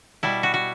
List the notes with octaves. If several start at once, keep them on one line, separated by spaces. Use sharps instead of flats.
B2 G3 E4
F#4
F#4